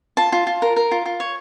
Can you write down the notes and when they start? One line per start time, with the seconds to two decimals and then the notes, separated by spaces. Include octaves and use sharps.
0.17 F4 A5
0.32 F4
0.47 F4
0.62 A#4
0.76 A#4
0.91 F4
1.06 F4
1.20 C#5